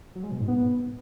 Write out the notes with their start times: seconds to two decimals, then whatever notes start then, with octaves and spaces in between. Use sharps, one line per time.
0.15 F#3
0.23 G#3
0.32 B2
0.40 G#2
0.48 B3